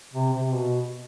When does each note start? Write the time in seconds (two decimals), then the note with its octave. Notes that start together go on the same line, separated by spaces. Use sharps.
0.13 C3
0.33 C3
0.55 B2